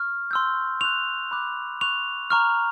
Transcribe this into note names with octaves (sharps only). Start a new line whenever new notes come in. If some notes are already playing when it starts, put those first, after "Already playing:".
Already playing: C#6 F6
C6 E6 G6
C#6 F#6 F7
B5 D6 F#6
C#6 F#6 F7
A#5 C#6 F6